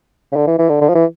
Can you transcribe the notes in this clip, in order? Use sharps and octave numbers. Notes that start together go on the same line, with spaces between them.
C#3
D3
E3
E3
D3
D3
F3
E3